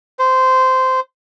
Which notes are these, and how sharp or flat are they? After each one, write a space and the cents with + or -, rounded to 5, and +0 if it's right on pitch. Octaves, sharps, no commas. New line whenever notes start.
C5 -15